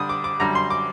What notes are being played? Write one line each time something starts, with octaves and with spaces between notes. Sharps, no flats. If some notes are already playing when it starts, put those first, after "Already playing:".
Already playing: D3 G3 D4 D#6
D6
D6
F#2 D3 G3 A#5
C6
D6